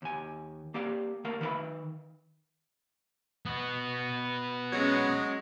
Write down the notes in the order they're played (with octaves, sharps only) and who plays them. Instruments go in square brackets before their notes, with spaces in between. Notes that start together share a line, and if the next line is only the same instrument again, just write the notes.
[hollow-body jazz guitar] D#2 G#5
A#3 G4 D5 F5
D#2 A3 A#4 F5
D#3 B4 C5 F5 B5
[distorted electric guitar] B3 F#4
[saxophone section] F#3 G#3 [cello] C#4